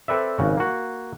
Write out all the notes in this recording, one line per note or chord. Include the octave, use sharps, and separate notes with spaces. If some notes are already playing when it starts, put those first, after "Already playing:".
C4 A4 B4 D5 E5
G#1 C#3 F#4
A#3 F#4